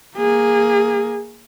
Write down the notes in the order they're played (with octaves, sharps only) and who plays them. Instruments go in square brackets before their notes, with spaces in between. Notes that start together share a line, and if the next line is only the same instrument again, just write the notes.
[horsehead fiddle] A#3 G#4